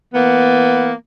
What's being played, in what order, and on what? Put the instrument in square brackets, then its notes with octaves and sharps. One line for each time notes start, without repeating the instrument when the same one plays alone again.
[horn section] E3 A#3 B3